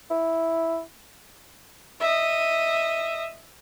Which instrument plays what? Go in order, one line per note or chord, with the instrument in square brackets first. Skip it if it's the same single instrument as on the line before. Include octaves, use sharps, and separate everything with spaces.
[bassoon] E4
[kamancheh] D#5 E5